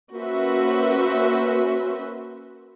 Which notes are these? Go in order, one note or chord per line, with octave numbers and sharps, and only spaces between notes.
A#3 C#4 F#4 B4 C5 E5